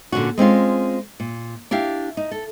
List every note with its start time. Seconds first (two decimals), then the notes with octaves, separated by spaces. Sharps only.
0.12 A#2 D3 C#4 F#4
0.38 G#3 C4 C#4 F4
1.20 A#2
1.71 D4 E4 G4 F5
2.17 D#4
2.31 A4